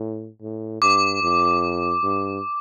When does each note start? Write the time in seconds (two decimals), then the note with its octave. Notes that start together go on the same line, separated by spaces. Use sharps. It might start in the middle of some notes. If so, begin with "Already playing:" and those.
Already playing: A2
0.42 A2
0.82 G2 D6
1.22 F2
2.03 G2